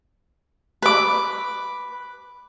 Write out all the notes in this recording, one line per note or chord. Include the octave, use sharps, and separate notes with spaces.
B4 D6